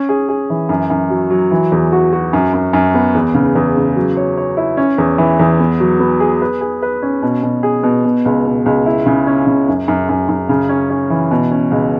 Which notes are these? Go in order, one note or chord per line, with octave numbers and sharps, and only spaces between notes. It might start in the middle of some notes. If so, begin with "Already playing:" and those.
Already playing: C#4
G#4
G#4
E3
F#2
F#2
F#3
F#3
E3
E2
F#4
F#4
F#2
F#2
F#2
B3
E2
C#3
E2
C#3
F#3
C#5
C#5
E4
C#4
E2
E3
E2
B3
F#3
B3
G#4
B4
G#4
B4
C#4
B2
B2
G#4
B2
B2
C#2
B2
C#2
E4
C#3
C#4
C#3
F#2
F#2
F#2
F#2
C#3
C#4
C#4
E3
B2
C#4
C#2